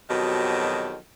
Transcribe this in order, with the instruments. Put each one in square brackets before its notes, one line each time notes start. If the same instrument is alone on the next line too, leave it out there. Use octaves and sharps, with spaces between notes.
[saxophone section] F2 B2 D#3 F#3 G4